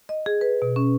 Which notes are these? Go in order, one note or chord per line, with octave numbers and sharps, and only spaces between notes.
D#5
G#4
B4
B2
C#4